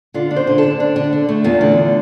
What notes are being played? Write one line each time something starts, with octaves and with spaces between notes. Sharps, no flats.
D3 F4
D4
C5
D3
D4 A4
D4
D3
D4
A3
E2 F4
D3